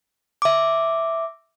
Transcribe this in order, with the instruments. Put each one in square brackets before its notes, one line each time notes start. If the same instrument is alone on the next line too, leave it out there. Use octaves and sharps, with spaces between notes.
[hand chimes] E5 D6